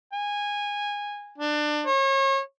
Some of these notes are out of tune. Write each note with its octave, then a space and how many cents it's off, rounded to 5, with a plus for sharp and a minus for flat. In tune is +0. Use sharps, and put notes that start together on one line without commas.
G#5 -15
D4 +25
C#5 -35